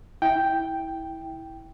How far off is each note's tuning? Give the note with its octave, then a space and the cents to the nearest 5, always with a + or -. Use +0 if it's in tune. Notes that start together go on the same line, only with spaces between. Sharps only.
E4 -15 G5 +0